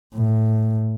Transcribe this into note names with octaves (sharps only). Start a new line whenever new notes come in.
A2